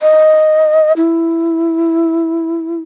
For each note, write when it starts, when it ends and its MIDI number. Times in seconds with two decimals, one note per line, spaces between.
0.01 0.93 75
0.97 2.81 64